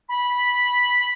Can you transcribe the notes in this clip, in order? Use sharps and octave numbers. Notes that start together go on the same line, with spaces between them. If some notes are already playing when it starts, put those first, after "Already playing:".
B5